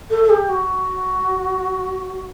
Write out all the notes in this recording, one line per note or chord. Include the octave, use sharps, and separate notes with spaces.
A4
A4
G4
F#4